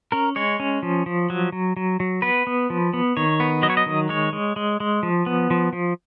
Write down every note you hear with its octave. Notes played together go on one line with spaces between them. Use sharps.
C#4 A#4
G#3 C#5
C#4
F3
F3
F#3
F#3
F#3
F#3
B3 B4
B3
F3
B3
D#3 C#5
B3
F#3 D#5
C#5
D#5
D#3
G#3 C#5
G#3
G#3
G#3
F3
B3
F3
F3